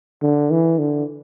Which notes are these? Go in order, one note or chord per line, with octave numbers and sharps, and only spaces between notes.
D3
E3
D3